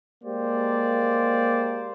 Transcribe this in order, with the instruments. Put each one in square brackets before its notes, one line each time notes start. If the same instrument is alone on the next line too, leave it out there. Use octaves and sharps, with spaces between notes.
[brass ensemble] G#3 A#3 G4 C5 D5